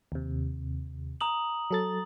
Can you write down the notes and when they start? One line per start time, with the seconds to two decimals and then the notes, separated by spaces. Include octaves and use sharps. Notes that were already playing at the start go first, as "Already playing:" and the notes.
0.12 D#2 C3
1.21 A#5 D#6 F#7
1.71 F#3 A4 A6